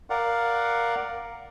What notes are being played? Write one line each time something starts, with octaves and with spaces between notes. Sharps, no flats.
A#4 D5 F5 F#5